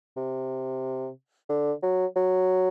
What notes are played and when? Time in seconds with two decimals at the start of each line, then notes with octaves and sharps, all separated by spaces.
0.17 C3
1.49 D3
1.83 F#3
2.16 F#3